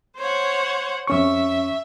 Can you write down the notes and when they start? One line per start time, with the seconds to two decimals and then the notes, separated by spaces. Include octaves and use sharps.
0.17 C5 C#5 F#5
1.07 F2 C#4 E5 C#6